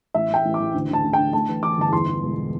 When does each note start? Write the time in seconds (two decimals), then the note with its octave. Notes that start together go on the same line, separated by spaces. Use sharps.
0.14 A1 E5
0.30 A1 G5
0.45 A1
0.54 D6
0.60 A1
0.74 D2
0.89 D2 A5
1.04 D2
1.13 D3 G5
1.33 A3 A5
1.49 E3
1.63 E3 D6
1.78 G1 A5
1.92 E2 C6
2.08 E2
2.22 E1